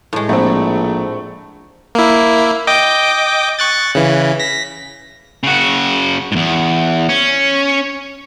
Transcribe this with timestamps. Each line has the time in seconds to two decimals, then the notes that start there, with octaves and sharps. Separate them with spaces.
0.13 A2 G#3
0.29 A#1 A3 C4
1.95 A#3 E4
2.67 D#5 G5 D6
3.59 C#6 F#6 A6
3.95 C#3 E3
4.40 A#6 B6
5.43 C#3 F#4
6.32 E2 G#2
7.09 C#4